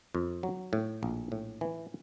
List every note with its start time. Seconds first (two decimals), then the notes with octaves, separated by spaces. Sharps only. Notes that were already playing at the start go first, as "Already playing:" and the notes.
0.15 F2
0.43 F#3
0.73 A2
1.03 A#1
1.32 A2
1.61 E3